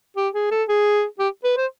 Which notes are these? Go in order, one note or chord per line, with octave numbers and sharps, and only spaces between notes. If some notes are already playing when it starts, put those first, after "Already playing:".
G4
G#4
A4
G#4
G4
B4
C5